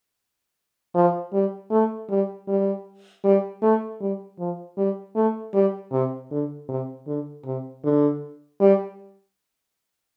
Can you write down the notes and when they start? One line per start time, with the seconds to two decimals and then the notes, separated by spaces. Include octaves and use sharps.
0.95 F3
1.33 G3
1.71 A3
2.10 G3
2.48 G3
3.24 G3
3.62 A3
4.01 G3
4.39 F3
4.77 G3
5.16 A3
5.54 G3
5.92 C3
6.31 D3
6.69 C3
7.07 D3
7.45 C3
7.84 D3
8.61 G3